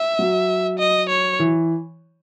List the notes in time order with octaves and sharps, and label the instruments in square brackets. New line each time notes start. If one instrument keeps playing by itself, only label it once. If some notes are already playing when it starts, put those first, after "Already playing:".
Already playing: [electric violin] E5
[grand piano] F#3
[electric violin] D#5
C#5
[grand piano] E3